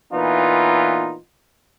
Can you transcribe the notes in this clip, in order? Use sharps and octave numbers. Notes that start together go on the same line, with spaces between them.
A#2 E3 B3 D#4 F4